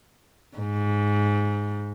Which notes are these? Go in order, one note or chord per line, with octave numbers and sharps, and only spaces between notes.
G#2